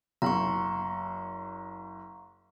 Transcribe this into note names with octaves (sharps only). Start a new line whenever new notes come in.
F#1 A#5 C6 C#6